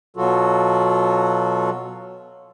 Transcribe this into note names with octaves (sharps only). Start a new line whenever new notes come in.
B2 F#3 F4 F#4 A4